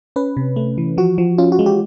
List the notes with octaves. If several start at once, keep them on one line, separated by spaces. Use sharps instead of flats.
C#4 B4
C3
A3
E3
F3 F#4
F3
C#4 F4
F#4
G#3
G4